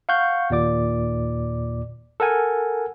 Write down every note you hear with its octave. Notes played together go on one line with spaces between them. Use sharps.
F5 F#5 C#6 G6
D#2 A#2 D5 D6
A4 A#4 F#5 G#5